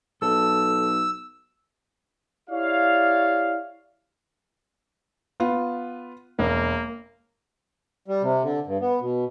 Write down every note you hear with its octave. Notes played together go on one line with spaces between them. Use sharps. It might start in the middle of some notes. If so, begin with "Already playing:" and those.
B1 A4 E6
E4 G4 C#5 D5 F5
B3 F4
E1 A#3
G3
C3
D3
G2
B3
B2